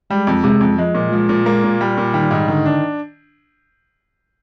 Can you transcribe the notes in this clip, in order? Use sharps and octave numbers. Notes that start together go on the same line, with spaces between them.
G3 G#3
F2
C3 G#3
F2
F3 G#3
A#2
F3 G#3
A#2
G#3 A#3
A#2
G3
A#2
D#3 G3
G#2
D3 D#3
D4